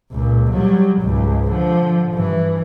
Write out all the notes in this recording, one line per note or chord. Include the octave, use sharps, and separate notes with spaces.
C#2 A#2
F#3 G3
C#2 G#2
D3 F3
G2 E3